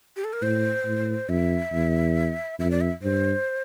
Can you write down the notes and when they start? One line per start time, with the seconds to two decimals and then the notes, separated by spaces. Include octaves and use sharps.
0.17 G4
0.24 A4
0.33 A#4
0.42 A2 C5
0.85 A2
1.28 F2 E5
1.72 E2
2.59 F2 E5
2.71 D5
2.81 E5
3.03 G2 C5